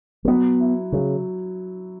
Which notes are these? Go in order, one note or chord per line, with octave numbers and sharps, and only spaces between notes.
G#3
F#3 B3
E4
C#3 F#3